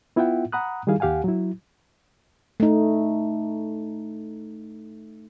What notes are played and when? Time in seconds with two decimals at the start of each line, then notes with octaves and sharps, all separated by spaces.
0.16 B3 E4 F4 E5 F#5 G5
0.52 F#5 A#5 B5 D#6 F#6
0.87 D#3 G3 E4 G#4 F5
1.00 D#2 G4 F5 F#5 G#5
1.24 F#3 E4
2.60 A3 D#4